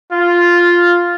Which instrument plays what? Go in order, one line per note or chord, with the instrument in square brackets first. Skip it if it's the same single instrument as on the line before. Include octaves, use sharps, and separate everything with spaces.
[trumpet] F4